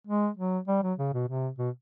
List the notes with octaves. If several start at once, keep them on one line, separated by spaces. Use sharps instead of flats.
G#3
F#3
G3
F#3
C#3
B2
C3
B2